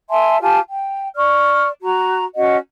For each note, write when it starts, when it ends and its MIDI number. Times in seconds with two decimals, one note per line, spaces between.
0.10 0.37 76
0.10 0.37 80
0.10 0.37 81
0.10 0.37 84
0.41 0.58 65
0.41 0.58 67
0.41 0.58 80
0.41 0.58 81
0.69 1.08 79
1.16 1.68 74
1.16 1.68 85
1.16 1.68 89
1.82 2.24 66
1.82 2.24 82
2.35 2.56 61
2.35 2.56 66
2.35 2.56 75
2.35 2.56 78